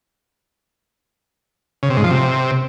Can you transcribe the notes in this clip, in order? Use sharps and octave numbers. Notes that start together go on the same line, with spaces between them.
C#3
C3
G#2
F3
C3